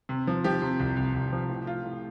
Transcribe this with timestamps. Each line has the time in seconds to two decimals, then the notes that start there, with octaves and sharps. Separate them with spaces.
0.09 C3
0.27 F3
0.44 F3 G4
0.62 C3
0.80 C2
0.96 C2
1.14 C2
1.32 F3
1.50 A2
1.67 F4
1.84 A2